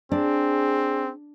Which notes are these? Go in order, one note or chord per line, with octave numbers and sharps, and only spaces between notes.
C4 D4 G#4